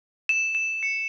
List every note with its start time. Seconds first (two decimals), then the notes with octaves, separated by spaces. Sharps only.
0.29 E7
0.55 E7
0.83 C#7